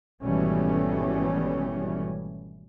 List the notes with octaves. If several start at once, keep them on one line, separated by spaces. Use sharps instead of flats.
G#1 B2 E3 G3 A3 C#4